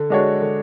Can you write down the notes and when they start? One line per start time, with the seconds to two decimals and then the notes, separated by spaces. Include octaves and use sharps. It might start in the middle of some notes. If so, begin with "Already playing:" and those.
Already playing: D3
0.10 G#3 D4 F#4 C#5
0.42 D3